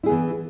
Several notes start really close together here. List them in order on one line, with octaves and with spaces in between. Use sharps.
E4 G#4 B3 E3